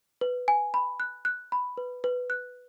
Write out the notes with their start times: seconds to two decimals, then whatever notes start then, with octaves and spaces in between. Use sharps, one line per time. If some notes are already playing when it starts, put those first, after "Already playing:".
0.21 B4
0.48 G#5
0.74 B5
1.00 F#6
1.25 F#6
1.52 B5
1.78 B4
2.04 B4
2.30 F#6